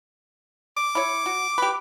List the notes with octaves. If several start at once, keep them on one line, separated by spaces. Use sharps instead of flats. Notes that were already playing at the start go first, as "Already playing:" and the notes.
D6
E4 C#5
F#4
G4 B4